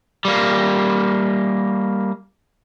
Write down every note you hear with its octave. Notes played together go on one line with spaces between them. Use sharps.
G3 A#3